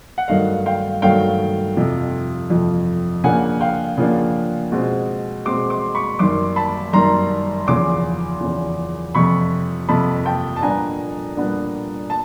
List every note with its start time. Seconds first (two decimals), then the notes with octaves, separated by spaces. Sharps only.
0.18 F#5
0.28 G2 D#3 F#3 A3 D#5 F5
0.66 F5 G5
1.02 G2 D#3 F#3 A3 F5 G5
1.77 F2 C3 F3
2.50 F2 C3 F3
3.24 C#3 F3 A#3 D4 F#5 G#5
3.61 F5 G5
3.97 C#3 F3 A#3 D4
4.72 B2 G#3 C4
5.45 B2 G#3 C4 C6 D6
5.70 C6 D6
5.95 B5 C#6
6.19 F#2 D#3 G3 C6 D6
6.56 A5 B5
6.93 F#2 D#3 G3 A#5 C6
7.67 E2 C#3 F3 C6 D6
8.41 E2 C#3 F3
9.15 F2 C3 F3 B5 C#6
9.89 F2 C3 F3 A5 B5
10.25 G5 A5
10.56 A5
10.62 A#2 G3 B3 D4 G#5 A#5
11.37 A#2 G3 B3 D4
12.10 A5